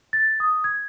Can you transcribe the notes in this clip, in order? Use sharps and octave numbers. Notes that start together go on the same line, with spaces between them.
A6
D#6
G#6